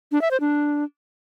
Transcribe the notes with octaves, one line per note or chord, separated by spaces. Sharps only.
D4
E5
C5
D4